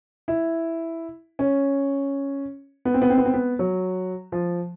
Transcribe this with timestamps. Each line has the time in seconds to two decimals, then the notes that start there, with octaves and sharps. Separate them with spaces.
0.28 E4
1.39 C#4
2.85 B3
2.94 C4
3.02 B3
3.10 C4
3.18 B3
3.25 C4
3.34 B3
3.59 F#3
4.32 F3